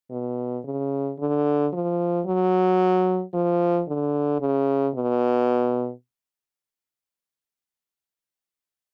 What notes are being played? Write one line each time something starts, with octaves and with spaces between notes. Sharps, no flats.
B2
C#3
D3
F3
F#3
F3
D3
C#3
B2